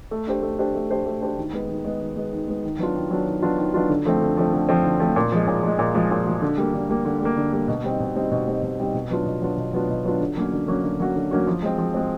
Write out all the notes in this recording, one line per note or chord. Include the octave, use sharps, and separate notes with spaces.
A3
D4 G4 C5
A3
D4 G4 C5
A3
D4 G4 C5
A3
D4 G4 C5
D#3
G#3 B3
D#3
G#3 B3
D#3
G#3 B3
D#3
G#3 B3
D#3
F#3 B3 D4 F4
D#3
F#3 B3 D4 F4
D#3
F#3 B3 D4 F4
D#3
F#3 B3 D4 F4
D3
F3 A3 C4
D3
F3 A3 C4
D3
F3 A3 C4
D3
F3 A3 C4
A#2
F3 G#3
A#2
F3 G#3
A#2
F3 G#3
A#2
F3 G#3
D3
G3 A#3
D3
G3 A#3
D3
G3 A#3
D3
G3 A#3
B2
G3 C4 D#4
B2
G3 C4 D#4
B2
G3 C4 D#4
B2
G3 C4 D#4
B2
F#3 B3 D4 F4
B2
F#3 B3 D4 F4
B2
F#3 B3 D4 F4
B2
F#3 B3 D4 F4
D3
F#3 A#3 C#4 F#4
D3
F#3 A#3 C#4 F#4
D3
F#3 A#3 C#4 F#4
D3
F#3 A#3 C#4 F#4
F3
G#3 C4
F3
G#3 C4